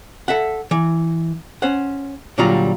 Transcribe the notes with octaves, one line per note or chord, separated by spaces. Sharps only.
A4 E5 F#5
E3
C#4 C5 F#5
A#2 D3 F#3 G3 F4 A#5